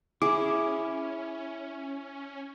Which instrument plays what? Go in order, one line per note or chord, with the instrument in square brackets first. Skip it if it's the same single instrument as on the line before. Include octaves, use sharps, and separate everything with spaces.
[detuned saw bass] C#4 [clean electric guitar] E4 [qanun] G#4 [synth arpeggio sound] D6